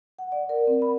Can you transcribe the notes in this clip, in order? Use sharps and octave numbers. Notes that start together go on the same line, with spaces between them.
F#5
D5
A#4
C4
B5